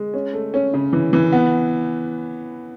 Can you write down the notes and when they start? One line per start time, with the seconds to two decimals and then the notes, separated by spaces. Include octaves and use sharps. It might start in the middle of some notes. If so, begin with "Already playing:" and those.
Already playing: G#3
0.14 C#4
0.33 A3
0.54 C#4
0.74 C#3
0.93 E3
1.13 E3
1.32 B3